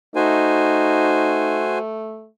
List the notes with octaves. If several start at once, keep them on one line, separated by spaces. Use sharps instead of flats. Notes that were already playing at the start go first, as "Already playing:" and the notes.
A3 D#4 F#4 C5 G#5